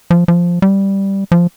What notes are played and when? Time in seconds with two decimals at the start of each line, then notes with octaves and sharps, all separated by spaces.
0.11 F3
0.28 F3
0.62 G3
1.32 F3